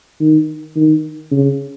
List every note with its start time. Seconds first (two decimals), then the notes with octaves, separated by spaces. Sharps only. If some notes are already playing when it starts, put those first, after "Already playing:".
0.20 D#3
0.76 D#3
1.31 C#3